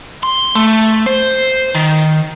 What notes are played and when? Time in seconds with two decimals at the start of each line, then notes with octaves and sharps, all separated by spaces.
0.23 C6
0.55 A3
1.07 C5
1.75 D#3